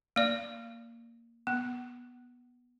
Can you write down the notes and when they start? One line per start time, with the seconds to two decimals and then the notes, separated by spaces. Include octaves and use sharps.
0.16 A#3 D5
1.47 B3